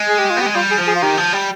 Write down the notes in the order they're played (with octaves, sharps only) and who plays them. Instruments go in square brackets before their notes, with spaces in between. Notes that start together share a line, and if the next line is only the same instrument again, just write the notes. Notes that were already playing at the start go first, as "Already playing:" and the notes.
Already playing: [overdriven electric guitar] G#3
[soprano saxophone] G#4
G4
F4
[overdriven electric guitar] B3 [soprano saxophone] G4
[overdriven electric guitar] G#3
[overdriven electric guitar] G3 [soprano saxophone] F4
[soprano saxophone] G#4
[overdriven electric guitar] F3
[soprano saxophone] G#4
F4
[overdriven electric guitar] D#3 [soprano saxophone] G4
[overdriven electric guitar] F3
G3